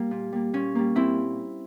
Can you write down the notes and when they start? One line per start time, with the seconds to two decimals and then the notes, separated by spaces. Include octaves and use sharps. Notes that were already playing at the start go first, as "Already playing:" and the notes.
Already playing: G3 A#3
0.11 A#2
0.33 G3 A#3
0.53 A#2 C#4
0.75 G3 A#3
0.95 A#2 C4 E4